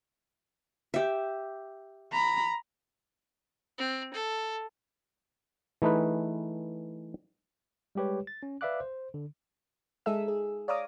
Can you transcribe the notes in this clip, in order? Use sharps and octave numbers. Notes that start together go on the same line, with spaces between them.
G4 E5
A#5 B5
C4
A4
E3 A3 D#4 G#4 B4
G3 G#3 G4 B4 C#5
A6
C#4
B4 D5 E5 F5 D6 F#6
C5
D3
G#3 D#4 G#4 A4 E5 E6
G#4
C#5 D5 F5 A#5 D6 D#6